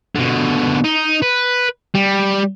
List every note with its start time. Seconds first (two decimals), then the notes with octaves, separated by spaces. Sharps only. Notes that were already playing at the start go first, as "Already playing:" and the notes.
0.15 B2 D3
0.84 D#4
1.22 B4
1.95 G3